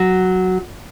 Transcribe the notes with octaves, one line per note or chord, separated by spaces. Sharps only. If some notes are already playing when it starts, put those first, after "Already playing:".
Already playing: F#3